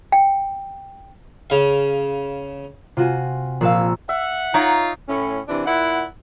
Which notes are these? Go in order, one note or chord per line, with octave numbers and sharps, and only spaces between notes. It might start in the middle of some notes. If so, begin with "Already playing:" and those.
G5
C#3 F5
C3 F4 F#4 G#5
A#1 G#4 F5 E6
E5 F#5
D#4 F4 C#5 A#5
A2 C#4
C3 E3 D4
A#2 E4 F#5